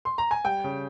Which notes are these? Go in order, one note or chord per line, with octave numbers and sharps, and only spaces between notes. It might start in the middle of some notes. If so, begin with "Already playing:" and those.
C6
A#5
G#5
G3 G5
C#3